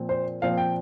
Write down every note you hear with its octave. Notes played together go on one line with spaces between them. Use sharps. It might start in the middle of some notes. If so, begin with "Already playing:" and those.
Already playing: A#2 F3 C4
C5
A#2 F3 C4 F5
G5